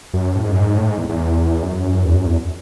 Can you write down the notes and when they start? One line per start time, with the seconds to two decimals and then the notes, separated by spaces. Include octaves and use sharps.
0.13 F#2
0.35 A2
0.43 G#2
0.52 F#2
0.60 G#2
0.77 A2
0.88 G#2
0.98 E2
1.09 E2
1.62 F#2
2.05 E2
2.15 F#2
2.26 E2